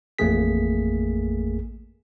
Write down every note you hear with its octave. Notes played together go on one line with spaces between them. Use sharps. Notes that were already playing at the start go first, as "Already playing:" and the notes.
A1 F2 A3 A#3 G#4 B6